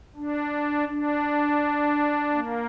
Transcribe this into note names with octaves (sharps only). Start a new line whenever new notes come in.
D4
D4
A#3